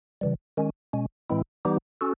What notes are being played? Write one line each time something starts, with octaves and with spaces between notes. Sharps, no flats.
C#3 E3 G3
D#3 G#3 C#4
B2 G#3 C#4
A2 E3 G#3 C4 E4
E3 G3 B3 D#4 G4
C#4 F#4 A4